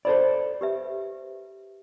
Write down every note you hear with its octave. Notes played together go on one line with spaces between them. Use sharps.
A4 C5 D5 B5
G4 B4 E5